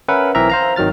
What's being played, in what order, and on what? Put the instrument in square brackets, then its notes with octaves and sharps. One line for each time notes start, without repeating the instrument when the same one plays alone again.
[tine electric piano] C#4 A#4 B4 E5 F#5
B1 E3 C4 A#4 E5 A#5
C5 F5 A#5
G#1 D#3 F#3 F6 A6